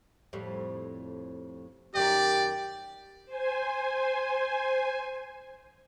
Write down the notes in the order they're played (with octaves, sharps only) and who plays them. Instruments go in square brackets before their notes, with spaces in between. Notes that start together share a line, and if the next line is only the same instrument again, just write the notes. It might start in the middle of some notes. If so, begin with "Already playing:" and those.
[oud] F2 A2 G3
[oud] F#2 D#3 A#4 [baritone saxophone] G4 [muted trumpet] D5
[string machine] C5 G#5